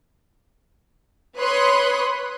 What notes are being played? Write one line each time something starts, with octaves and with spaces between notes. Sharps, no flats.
B4 C#5 B5 C6 D#6 F#6